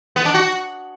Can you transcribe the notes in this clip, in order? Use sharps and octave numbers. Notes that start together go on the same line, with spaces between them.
B3
D4
F#4